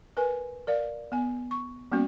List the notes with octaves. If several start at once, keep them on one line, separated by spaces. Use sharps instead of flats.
A#4 B4 G#5
A#4 D5 F5
B3 G#5
C#6
G3 A#3 B3 C#4 F#4